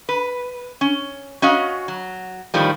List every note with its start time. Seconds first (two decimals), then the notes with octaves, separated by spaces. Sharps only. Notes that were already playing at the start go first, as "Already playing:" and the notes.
0.09 B4
0.81 C#4
1.42 C#4 F#4 D#5 F5
1.88 F#3
2.54 A2 D#3 F3 G3